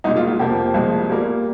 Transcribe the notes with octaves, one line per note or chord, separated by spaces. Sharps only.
C2 A#2 G#3 D#4
F4
F4
F2 C3 F3 A#3 G4
C2 A#2 F3 G#3
A#2 G3 A#3